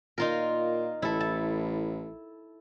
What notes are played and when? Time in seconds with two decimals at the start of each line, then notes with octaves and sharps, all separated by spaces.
0.18 A#2 D#4 F4 A#4
1.02 A1 E4 A4
1.20 A5